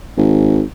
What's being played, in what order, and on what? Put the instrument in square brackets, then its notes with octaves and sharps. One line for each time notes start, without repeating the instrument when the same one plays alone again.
[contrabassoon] G#1